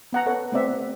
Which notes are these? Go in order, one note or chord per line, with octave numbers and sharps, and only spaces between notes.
B3 F#5 A#5
A4 B4 C#5 F#5
A3 B3 C4 D5 E5